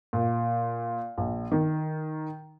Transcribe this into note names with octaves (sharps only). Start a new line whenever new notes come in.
A#2
A#1
D#3